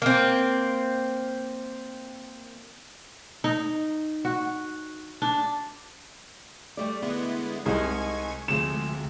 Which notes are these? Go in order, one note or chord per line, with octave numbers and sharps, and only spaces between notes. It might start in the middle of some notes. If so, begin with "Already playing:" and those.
A#3 C4
D#4
F#4
D4
G3 A3 D5
D3 G#3 B3 E4
C2 G#3 C4 D#4 G#5 C#6 G#6
D2 C3 F3 G#3 A3 E7